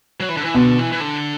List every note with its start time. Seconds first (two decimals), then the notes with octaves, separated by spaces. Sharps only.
0.20 F#3
0.29 E3
0.37 D3
0.44 E3
0.54 B2 D3
0.78 E3
0.92 E3
1.00 D3